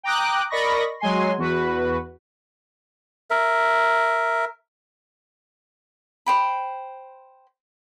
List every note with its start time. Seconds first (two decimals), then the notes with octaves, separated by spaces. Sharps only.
0.03 G5 A#5 D6 D#6 F#6
0.50 A#4 D5 D#5 B5 C#6 A#6
1.00 F#3 G#3 G#5 C6
1.38 E2 F#4 B4
3.30 A#4 E5
6.26 C5 G5 B5